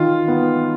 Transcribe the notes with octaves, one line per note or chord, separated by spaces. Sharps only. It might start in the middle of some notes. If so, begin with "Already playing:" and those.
Already playing: D#3 F4
B3